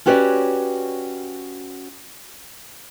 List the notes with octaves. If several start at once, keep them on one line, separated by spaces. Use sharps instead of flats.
C#4 F#4 G4 B4 C#5 D5